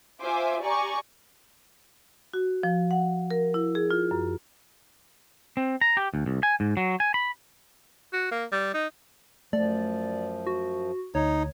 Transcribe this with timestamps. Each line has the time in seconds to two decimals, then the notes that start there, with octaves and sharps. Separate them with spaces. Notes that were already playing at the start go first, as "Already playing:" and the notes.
0.21 F4 C5 E5 G#5 D6
0.61 G4 D5 G#5 A#5 C#6
2.33 F#4
2.63 F3
2.91 F#5
3.31 A#4
3.54 E4
3.75 G#4
3.91 F4
4.11 F#2
5.57 C4
5.81 A#5
5.97 G4
6.14 D2
6.26 C2
6.43 G#5
6.60 G#2
6.77 F#3
7.00 G#5
7.14 B5
8.13 F#4
8.31 A#3
8.52 G3
8.74 D#4
9.53 F#2 F3 A3 D5
10.47 F#4
11.15 D2 D#4 C#5